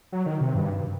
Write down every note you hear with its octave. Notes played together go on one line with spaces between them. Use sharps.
F#3
D#3
C3
G2